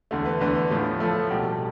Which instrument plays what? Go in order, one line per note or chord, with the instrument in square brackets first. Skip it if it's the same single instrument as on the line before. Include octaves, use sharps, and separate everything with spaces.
[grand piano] E2 D3 A3
B4
E2 D3 A3 B4
A2 F3 A3
A2 F3 A3 A4
C2 B2 G3 G4
A4